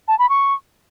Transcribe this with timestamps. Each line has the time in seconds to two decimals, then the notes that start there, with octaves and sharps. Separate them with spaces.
0.08 A5
0.19 B5
0.29 C#6